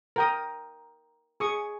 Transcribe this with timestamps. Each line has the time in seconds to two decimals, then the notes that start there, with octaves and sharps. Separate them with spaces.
0.16 A#4 G5 D#6
1.40 G#4 C#6 D#6